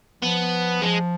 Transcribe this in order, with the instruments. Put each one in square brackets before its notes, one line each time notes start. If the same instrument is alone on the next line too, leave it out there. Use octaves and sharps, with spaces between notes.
[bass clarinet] F3 [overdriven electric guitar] B3
[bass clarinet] F3 [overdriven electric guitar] G#3